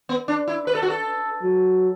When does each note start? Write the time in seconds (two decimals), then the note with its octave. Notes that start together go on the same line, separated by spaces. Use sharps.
0.09 B3
0.28 D4
0.48 E4
0.67 B4
0.75 A4
0.83 F#4
0.90 A4
1.43 F#3